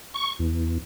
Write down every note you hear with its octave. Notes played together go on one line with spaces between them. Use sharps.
C#6
E2